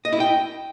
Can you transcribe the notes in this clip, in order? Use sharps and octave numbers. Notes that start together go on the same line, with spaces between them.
D#5
E4
G5